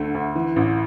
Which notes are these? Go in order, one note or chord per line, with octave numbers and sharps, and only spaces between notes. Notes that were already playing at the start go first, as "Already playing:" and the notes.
Already playing: D2 D3 A3
D2
E3
A1